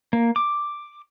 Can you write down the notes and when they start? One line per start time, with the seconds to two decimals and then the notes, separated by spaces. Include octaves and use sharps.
0.13 A#3
0.36 D6